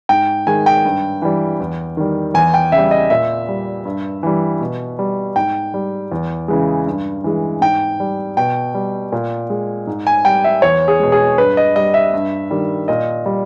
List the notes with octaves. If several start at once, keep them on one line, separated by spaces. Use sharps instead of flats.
G#2 G5
D#3 G#3 G#5
G5
G2
E3 G3
E2
D#3 G3
E2 G#5
G5
C#3 E5
G3
D#5
A#2 E5
G3
G2
E3 G3
B2
G3
G#2 G5
G3
E2
C#3 E3 G#3
G2
E3 G#3
G#2 G5
G3
B2 G5
G3
A#2
G#3
G#2
G#5
G3 G5
E5
E2 C#5
G#4
B2 G#3
G#4
G2 B4
D#5
G3 D#5
E5
G2
D#3 G3
A#2 D#5
G3